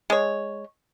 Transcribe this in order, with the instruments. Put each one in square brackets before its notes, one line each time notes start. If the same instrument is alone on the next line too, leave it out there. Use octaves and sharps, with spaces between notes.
[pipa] G#3 C#5